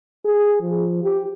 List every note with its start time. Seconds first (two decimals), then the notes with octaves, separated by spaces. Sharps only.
0.25 G#4
0.62 F3
1.04 G4